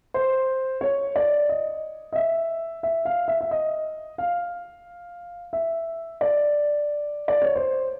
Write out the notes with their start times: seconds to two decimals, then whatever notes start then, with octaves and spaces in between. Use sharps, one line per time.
0.14 C5
0.81 C#5
1.16 D5
1.49 D#5
2.13 D#5
2.16 E5
2.83 E5
3.05 F5
3.28 E5
3.41 E5
3.51 D#5
4.18 F5
5.53 E5
6.21 D5
7.28 D5
7.42 C#5
7.56 C5